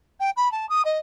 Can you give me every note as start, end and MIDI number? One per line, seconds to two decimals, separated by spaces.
0.20 0.30 79
0.36 0.51 83
0.52 0.69 81
0.69 0.82 87
0.85 0.98 75